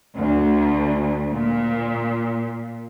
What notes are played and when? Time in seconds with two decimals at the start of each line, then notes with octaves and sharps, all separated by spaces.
0.17 D2
1.32 A#2